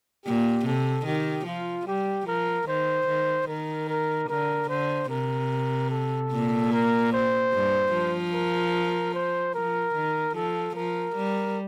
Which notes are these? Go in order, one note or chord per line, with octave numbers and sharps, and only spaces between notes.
A#2 G4
C3 A4
D#3 G4
F3 F4
G3 G4
F3 A#4
D#3 C5
D#3
D#3 A#4
A#4
D3 A#4
D3 C5
C3 A#4
A4
A#2
A#4
C5
G2
F3
A#4
C5
F3 A#4
D#3
F3 A4
F3 A#4
G3